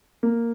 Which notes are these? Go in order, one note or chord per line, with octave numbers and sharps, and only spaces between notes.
A#3